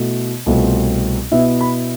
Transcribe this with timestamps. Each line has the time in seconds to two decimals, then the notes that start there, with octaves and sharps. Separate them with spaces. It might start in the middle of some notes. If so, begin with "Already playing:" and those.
Already playing: B2 A3 E4
0.46 C2 B2 A3 C4 F4
1.32 B2 B3 E4 E5
1.61 B5